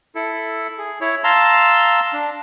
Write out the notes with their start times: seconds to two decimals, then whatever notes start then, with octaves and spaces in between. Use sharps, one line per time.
0.15 E4 A4
0.78 G#4
1.01 E4 C#5
1.24 F5 A5 A#5 C6 E6
2.13 D4